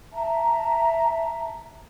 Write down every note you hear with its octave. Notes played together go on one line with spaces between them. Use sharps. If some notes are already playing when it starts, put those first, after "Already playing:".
E5 A5 A#5